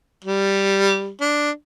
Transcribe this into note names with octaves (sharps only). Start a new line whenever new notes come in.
G3
D4